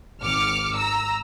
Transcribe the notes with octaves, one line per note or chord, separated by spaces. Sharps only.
G#1 D6 F6 C#7
A#5 E6